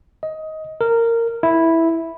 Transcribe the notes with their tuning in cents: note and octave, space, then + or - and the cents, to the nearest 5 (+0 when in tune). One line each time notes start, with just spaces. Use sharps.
D#5 +15
A#4 -15
E4 -5